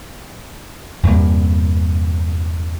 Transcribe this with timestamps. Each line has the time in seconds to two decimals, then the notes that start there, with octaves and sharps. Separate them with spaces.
1.03 E2 G2 C3 A#3